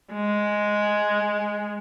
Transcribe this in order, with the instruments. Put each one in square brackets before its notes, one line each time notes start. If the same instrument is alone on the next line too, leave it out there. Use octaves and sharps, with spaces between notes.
[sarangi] G#3